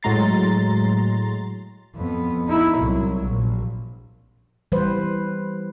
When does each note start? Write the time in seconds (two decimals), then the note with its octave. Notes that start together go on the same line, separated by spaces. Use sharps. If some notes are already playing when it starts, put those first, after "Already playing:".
0.03 A2 F#3 G#3 A#5 C6 A6
1.95 F2 B3
2.47 D#4 E4
2.78 C2 F#3
3.27 A#1
4.72 E3 G3 B4 C5